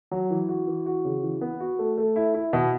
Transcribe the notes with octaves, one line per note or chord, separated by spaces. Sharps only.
F#3
E3
F#4
E3
F#4
C#3
E3
B3
F#4
A3
A3
E4
E4
B2